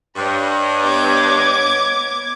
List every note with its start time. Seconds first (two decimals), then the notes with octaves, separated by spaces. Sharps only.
0.16 G2 B4 C#5 D#5
0.83 B3 D6 G#6